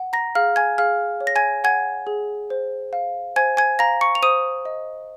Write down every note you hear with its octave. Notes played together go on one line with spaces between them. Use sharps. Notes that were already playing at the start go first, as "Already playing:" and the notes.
Already playing: F#5
A#5 A#6
G#4 F5 F6
G#5 G#6
G#4 F5 F6
C#5
A#6
G#5 G#6
F#5 G#5 G#6
G#4
C5
F5
C5 G#5 G#6
G#5 G#6
F5 A#5 A#6
C#6 C#7
F7
C5 D#6 D#7
D#5